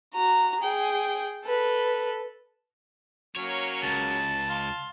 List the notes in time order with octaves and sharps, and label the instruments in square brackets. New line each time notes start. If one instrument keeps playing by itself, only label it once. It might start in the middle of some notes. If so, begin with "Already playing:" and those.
[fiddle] F#4 A#5
G#4 G5
A4 B4
[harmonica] F#3 A#3 C#4 [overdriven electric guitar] C#5
[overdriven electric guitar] C#2 C#3 [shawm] A5
[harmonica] F5 C6